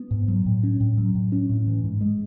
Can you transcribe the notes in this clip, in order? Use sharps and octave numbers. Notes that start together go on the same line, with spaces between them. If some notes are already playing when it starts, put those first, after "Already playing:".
Already playing: B3
G#2
F#3
A2
C#4
A2
F#3
A2
C#4
A2
E3
G#2
G#3